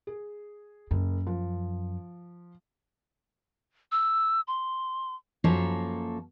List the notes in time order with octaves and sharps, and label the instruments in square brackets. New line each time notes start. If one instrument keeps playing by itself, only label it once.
[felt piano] G#4
[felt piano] F#1 [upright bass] F#2
[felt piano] F3
[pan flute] E6
C6
[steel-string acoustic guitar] F#2 F3 A#3 A4 C#5